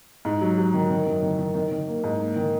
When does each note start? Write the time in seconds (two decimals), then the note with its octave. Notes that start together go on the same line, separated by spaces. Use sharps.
0.25 G#2
0.41 F#3
0.58 F#3
0.74 D#3
0.90 D#3
1.06 F#2
1.22 D#3
1.39 D#3
1.55 D#3
1.71 D#3
1.87 A#3
2.04 G#2
2.20 A#3
2.36 D#3